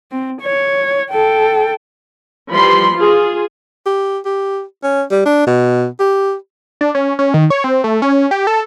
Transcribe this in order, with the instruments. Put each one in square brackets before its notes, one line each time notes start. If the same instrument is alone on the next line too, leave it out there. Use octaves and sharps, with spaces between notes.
[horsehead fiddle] C4
C#5
A4 G5
[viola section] E3 F3 G3 B5 C6
F4 G#4
[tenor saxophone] G4
G4
C#4
G3
D4
B2
G4
[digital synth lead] D4
C#4
C#4
D#3
C#5
C4
A3
C#4
G4
A4